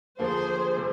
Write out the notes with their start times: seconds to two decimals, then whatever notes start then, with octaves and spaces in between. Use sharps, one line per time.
0.19 D#2 D3 F3 A#3 G#4 C5
0.77 C3 G3